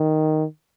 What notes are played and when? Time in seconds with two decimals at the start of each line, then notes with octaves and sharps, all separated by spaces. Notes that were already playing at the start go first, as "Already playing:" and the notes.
Already playing: D#3